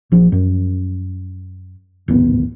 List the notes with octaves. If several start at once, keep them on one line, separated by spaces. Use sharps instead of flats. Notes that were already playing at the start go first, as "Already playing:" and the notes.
A#1 F3
F#2
D1 G#1 B3